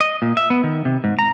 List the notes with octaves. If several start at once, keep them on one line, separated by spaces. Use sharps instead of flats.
D#5
A#2
E5
B3
D#3
C3
G#2
A#5